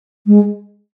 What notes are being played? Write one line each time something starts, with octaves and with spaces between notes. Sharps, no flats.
G#3